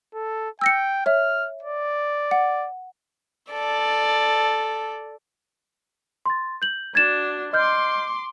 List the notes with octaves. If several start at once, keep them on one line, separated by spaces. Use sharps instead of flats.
A4
G5 E6 A#6 C#7
C#5 E5 F6
D5
F#5
A4 D5
C6 A6
G6 F#7
D4 F#4 G#6 A6 E7
D#5 C6 D6 F6 G6